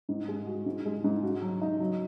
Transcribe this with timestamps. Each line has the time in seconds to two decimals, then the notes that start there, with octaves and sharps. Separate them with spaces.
0.09 G#2
0.28 G#3
0.47 F#4
0.66 G#2
0.86 G#3
1.04 G#2
1.23 F#4
1.42 F#3
1.62 D#4
1.80 F#3